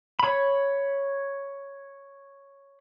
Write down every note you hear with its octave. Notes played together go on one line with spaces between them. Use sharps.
C#5 B5